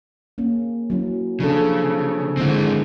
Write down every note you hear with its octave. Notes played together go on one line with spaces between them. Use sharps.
A#3 C#4
F#3 C#4 E4
C#3 F3 D4 A4
D3 G#3 C4 E4